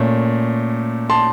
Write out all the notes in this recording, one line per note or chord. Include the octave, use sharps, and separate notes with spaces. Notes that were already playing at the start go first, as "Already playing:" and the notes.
Already playing: A#2 A3 C#4
A5 C6